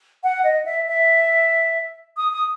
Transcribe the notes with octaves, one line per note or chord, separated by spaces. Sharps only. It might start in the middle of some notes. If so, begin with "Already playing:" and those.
F#5
D#5
E5
E5
D#6
D#6